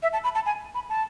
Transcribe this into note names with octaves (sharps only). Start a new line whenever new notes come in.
E5
A5
B5
A5
G#5
B5
A5